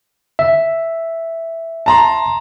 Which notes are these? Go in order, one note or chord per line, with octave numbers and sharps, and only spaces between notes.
E5
A5 A#5 C6